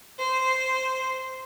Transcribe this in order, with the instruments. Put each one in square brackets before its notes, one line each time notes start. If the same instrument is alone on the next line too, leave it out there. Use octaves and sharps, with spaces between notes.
[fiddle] C5